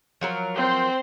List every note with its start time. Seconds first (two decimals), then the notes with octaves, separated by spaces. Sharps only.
0.21 F3 F#3 A#4
0.56 C4 C5 C6